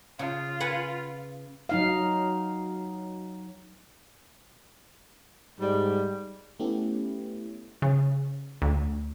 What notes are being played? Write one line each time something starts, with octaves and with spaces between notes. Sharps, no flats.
C#3 F4
B4 F#5 G#5
F#3 D#4 F5
G#2 G3
A3 B3 C#4 E4 G4
C#3
D2